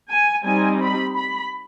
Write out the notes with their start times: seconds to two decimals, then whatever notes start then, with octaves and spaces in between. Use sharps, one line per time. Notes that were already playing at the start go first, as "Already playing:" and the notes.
0.09 G#5
0.44 G3 C4 D#4 G#5
0.81 B5
1.15 B5